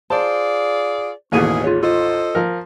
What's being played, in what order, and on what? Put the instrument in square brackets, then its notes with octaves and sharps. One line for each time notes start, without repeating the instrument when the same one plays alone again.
[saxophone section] F4 G#4 D5 [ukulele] C5 [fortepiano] A5
[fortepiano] A1 D#2 [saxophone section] B2 G#4 [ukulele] E4 C#5 G#5
[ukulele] F4 G#4 C#5
[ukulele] F4 [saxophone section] A4 C5 D#5
[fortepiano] F3 A#4